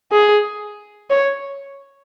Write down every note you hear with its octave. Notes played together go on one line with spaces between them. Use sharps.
G#4
C#5